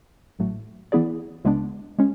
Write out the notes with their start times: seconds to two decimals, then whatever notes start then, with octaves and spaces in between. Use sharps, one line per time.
0.39 A1 A2 F#3 A3
0.92 E3 B3 E4 G#4 D5
1.44 C#2 C#3 G#3 B3 D4
1.99 G#3 C#4